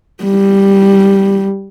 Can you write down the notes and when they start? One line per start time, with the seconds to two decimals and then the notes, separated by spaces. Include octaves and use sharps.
0.24 G3